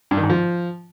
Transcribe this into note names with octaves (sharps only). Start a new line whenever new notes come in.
G2
D#3
G#2
F3